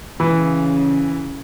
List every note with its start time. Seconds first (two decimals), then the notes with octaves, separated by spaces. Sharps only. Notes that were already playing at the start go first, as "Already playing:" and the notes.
0.20 C#3 E3